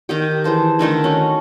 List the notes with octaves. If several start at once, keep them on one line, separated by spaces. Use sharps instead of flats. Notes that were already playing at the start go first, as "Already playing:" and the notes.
D#3 D#4 G4
E3 G#4 C5 A5
D3 D#3 A3 D#4
C#4 F#4